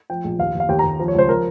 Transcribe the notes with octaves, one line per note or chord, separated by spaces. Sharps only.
F3 G5
A#1
D#2 F5
D#2
F5
D#2 G5
A#5
D#2
F3
C#5
C#2 C5
F3 A#4